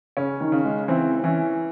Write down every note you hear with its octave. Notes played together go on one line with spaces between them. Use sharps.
C#3 C#4
D#3
C#3
G#3
E3 C4
E3 C#4